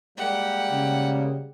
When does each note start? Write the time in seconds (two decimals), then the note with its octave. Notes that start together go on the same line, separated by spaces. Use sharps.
0.18 G3 G#3 A#3 G4 F#5
0.72 C#3